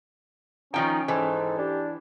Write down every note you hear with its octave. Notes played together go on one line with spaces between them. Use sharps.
D#3 F3 C#4 D#4 G5
G#2 E3 A4
D4 G4